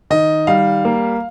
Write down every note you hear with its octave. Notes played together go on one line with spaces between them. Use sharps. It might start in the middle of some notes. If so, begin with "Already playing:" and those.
D#3 D#5
G3 F5
A#3